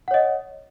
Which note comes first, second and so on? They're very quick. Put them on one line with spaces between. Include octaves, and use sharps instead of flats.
F#5 C#5 D#5